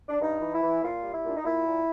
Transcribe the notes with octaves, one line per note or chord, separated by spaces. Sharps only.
D4
G2 D#4
E3
E4
E3
A#2 F4
G3
E4
A#2 D4
D#4
A#2 E4
A#2